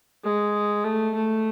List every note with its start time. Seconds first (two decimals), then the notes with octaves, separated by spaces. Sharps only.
0.24 G#3
0.84 A3
1.14 A3